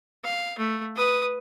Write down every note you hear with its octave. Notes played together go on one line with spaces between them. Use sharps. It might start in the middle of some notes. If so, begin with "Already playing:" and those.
F5
A3
B4 D#6